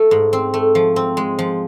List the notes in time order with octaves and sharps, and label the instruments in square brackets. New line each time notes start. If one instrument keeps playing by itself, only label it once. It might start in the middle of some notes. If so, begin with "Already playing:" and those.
Already playing: [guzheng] A3
G#2
C4
A3
F3
C4
G#3
F3